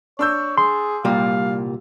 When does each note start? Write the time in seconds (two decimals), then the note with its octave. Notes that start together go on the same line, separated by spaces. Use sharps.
0.19 D4 C#5 E6 G6
0.58 G#4 C6
1.05 C2 A#2 G3 F5